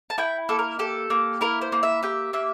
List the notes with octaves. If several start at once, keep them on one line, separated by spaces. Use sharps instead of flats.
A5
E4 G5
A#3 A4
A#4
G4 A4
A#3
E4 A#4
C5
A#3
E5
G4 E5
A#3 E5